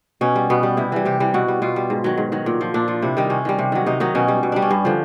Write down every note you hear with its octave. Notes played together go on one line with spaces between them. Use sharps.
B2 C#4
G3
B2 B3
G3
C3 E4
E3 G3
C3 G4
E3 G3
B2 F#4
G3
B2 F4
G3
G#2
D#3 F#3
G#2
D#3 F#3
A#2
F3
A#2 D4
F3
C3 E4
D#3 G3
C3 C#4
D#3 G3
C3
D#3 F#3
C3 D#4
D#3 F#3 D#4
B2 C#4
G3
B2
G3 D4
C#4
G2
D3 F3